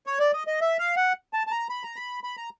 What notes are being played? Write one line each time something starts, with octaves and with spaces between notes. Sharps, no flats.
C#5
D5
D#5
D#5
E5
F5
F#5
A5
A5
A#5
B5
A#5
B5
B5
A#5